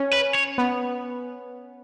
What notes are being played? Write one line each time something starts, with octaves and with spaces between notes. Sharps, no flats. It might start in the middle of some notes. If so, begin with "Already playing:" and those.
Already playing: C#4
B4
C#5
B3